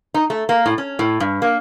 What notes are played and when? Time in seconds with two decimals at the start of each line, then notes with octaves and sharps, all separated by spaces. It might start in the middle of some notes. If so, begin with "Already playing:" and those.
0.14 D#4
0.30 A3
0.49 A#3
0.66 A2
0.78 C#4
0.99 A2
1.20 G2
1.42 A#3